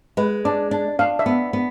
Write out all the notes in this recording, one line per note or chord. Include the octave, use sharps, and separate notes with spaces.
G#3 B4
D4 D5
D4
D4 F5
E5
B3
B3